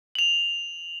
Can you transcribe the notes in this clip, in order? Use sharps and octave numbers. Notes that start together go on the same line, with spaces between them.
F7 F#7